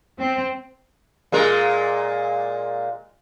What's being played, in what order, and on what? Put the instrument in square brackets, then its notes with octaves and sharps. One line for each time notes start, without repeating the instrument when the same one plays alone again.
[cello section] C4
[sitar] A#2 G#3 A#4